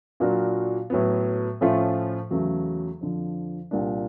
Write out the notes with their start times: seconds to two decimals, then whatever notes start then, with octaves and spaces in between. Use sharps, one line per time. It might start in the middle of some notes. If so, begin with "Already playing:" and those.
0.20 A#2 F#3 A#3 D4 F#4
0.90 A2 F#3 B3
1.61 A2 F3 A3 C#4 F4
2.31 E2 C#3 F#3 A3
3.01 F2 D3 F3
3.71 C2 A#2 G3 A#3 D4